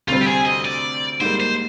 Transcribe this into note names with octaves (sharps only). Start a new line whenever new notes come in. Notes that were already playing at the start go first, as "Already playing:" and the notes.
D2 C3 G3 C4 F4
G4
G#4
D#5
D5
G#2 G3 A#3 C5
C5